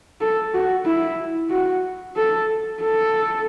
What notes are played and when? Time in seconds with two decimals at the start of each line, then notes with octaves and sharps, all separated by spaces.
0.21 A4
0.53 F#4
0.85 E4
1.50 F#4
2.16 A4
2.81 A4